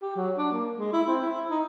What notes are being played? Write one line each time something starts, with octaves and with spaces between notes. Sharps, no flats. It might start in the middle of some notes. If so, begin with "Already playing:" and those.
G4
F#3
D4
A#3
G#3
E4
C4
E4
D#4